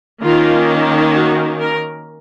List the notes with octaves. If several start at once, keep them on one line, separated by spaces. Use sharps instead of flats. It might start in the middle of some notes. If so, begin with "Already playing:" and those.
D#3 A#3 C#4 F4
F#4
A#4